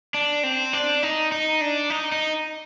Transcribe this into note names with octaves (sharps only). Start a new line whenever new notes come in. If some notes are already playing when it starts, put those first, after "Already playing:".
D4
C4
D4
D#4
D#4
D4
D#4
D#4